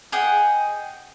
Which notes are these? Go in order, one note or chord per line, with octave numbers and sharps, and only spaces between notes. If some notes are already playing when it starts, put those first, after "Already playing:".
G#4 D#5 F#5 G5